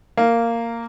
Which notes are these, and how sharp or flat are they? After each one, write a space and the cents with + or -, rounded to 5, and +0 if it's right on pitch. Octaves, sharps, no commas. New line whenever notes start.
A#3 -10